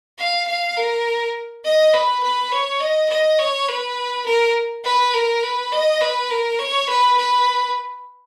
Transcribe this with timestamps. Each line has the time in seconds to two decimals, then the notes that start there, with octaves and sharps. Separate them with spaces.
0.18 F5
0.47 F5
0.76 A#4
1.65 D#5
1.93 B4
2.22 B4
2.52 C#5
2.80 D#5
3.09 D#5
3.39 C#5
3.68 B4
4.25 A#4
4.84 B4
5.14 A#4
5.43 B4
5.72 D#5
6.01 B4
6.30 A#4
6.59 C#5
6.89 B4
7.17 B4